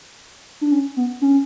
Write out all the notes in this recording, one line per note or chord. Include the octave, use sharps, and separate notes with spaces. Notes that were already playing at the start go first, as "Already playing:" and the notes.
D4
C#4
B3
C#4